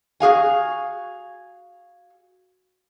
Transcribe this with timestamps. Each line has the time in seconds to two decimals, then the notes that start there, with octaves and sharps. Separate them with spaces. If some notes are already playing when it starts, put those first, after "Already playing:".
0.20 F#4 G#4 F5 G#5